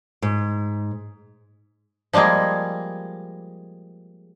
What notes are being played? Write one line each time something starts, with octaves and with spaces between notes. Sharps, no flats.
G#2
F3 G3 G#3 A#3 G#4